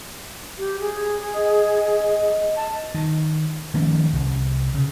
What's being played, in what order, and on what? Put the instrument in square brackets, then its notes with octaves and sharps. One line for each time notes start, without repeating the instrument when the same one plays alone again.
[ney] G4
G#4
[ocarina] D#5
[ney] A5
[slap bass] D#3
D#3 F3 A3 C#4
C2
C#3